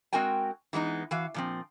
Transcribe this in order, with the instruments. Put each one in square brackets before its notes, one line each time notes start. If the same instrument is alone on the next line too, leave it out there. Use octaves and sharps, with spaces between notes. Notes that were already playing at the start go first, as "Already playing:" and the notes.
[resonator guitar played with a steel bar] G#3 C4 F#4 A#4 G5 G#5
E3 G#3 B3 D#4
E3 F#4 F5
A#2 F3 C4